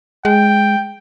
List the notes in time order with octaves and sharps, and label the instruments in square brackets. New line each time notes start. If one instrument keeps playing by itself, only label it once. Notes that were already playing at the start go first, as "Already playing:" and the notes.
[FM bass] G#3 [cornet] G5